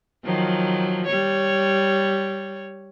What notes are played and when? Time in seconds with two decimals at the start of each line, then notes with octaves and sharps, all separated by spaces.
0.25 D#3 F3 F#3
1.06 G3 C#5